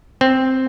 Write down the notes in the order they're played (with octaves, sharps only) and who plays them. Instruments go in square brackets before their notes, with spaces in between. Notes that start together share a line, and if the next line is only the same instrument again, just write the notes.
[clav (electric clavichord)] C4